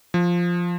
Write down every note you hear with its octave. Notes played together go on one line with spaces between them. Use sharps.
F3